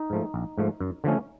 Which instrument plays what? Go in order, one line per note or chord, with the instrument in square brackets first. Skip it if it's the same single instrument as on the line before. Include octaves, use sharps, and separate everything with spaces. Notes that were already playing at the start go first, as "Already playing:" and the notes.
Already playing: [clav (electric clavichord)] D#4
G#2 F3 A3
A#1
G#2 F3 A3
F#2
D3 F3 A3 C#4